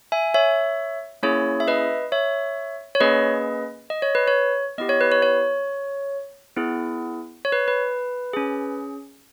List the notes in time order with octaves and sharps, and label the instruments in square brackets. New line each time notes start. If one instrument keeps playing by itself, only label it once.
[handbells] E5 G#5
C#5 E5
A#3 C#4 E4 G#4 C#5
E5
B4 D#5
C#5 E5
C#5
A#3 C#4 G#4 B4 D#5
D#5
C#5
B4
C#5
B3 E4 G4 D#5
C#5
B4
C#5
C#5
B3 E4 G#4
C#5
B4
B4
C#4 G#4